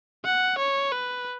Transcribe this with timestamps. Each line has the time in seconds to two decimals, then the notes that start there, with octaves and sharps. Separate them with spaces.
0.25 F#5
0.59 C#5
0.92 B4